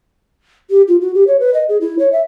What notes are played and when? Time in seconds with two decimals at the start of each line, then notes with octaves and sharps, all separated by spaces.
0.70 G4
0.88 F4
1.01 F#4
1.15 G4
1.27 C#5
1.40 B4
1.54 D#5
1.69 G#4
1.81 E4
1.99 C#5
2.12 E5